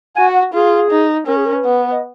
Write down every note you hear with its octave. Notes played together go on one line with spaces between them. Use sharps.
F#4 G#5
F#5
F4 G#4
D#4
C#4 A#4
G#4
A#4
B4
B3
D#5